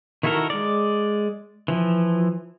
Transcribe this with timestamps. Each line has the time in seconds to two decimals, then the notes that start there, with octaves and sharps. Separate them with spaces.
0.23 D#3 E4 F#4 A4 A#4
0.50 G#3 D5
1.68 E3 F3